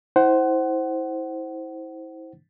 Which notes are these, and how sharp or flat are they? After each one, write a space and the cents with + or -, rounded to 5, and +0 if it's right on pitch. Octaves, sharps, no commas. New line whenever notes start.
E4 -25 C5 +0 F#5 +25